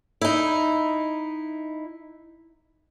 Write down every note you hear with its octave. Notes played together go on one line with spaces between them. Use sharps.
D#4 E4